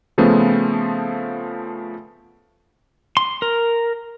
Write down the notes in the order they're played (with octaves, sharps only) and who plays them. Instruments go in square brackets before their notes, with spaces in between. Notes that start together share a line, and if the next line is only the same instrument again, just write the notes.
[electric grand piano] C#3 F3 A3 B3 C4 F4
[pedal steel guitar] C6
A#4